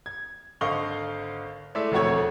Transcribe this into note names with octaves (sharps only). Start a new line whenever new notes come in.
G#6
G#1 D3 D#5 F5 C#6 G7
G#3 A3 E4 D5 E5
E1 F2 A3 F#4 C#5 G#6